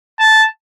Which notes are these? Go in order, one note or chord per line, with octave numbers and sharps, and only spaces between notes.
A5